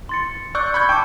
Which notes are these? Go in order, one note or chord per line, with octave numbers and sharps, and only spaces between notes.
C6 A6 C#7
D5 C#6 E6 F#6 G6 C#7
B5 C#6 G6 G#6
G5 A5 C#6 D6 C#7